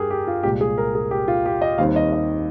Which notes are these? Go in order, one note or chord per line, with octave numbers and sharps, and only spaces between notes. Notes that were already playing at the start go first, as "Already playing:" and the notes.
Already playing: G2 G4 G#4 A#4
G4
F4
C2 A#2 G#3 G4
G#4
A#4
G#4
G4
F4
G4
D#5
D#2 D#3 G3 C4 F5
D#5
D#5